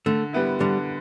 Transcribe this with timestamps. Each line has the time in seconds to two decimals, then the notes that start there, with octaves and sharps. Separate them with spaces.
0.06 D3 A3
0.33 G3 B3 E4
0.60 D3 G3